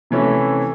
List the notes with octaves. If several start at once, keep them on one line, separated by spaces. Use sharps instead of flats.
C3 E3 A3 C#4 E4